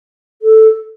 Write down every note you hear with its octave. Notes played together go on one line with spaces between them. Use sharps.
A4